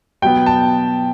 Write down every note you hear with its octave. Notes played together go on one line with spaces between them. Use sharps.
B2 F#3 B3 G5
A5